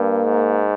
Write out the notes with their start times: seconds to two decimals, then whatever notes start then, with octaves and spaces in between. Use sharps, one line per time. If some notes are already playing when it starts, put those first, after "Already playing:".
Already playing: G2 A#3
0.24 G#2